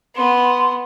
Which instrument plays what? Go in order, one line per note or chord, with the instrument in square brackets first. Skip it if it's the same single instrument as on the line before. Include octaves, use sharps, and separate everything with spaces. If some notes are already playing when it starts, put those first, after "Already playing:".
[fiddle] B3 [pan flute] C6